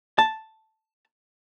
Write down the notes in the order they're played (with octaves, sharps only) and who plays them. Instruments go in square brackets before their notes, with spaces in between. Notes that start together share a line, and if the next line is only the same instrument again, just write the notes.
[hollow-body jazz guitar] A5